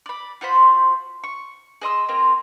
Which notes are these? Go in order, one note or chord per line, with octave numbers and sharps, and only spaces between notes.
D5 B5
F4 F#4 C5 B5
C#6
G#4 D#5 C6 E6
A#3 C4 F4 A#5